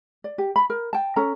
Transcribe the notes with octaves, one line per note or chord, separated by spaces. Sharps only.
D5
G4
B5
A#4
G5 A5
C#4 A4 A#5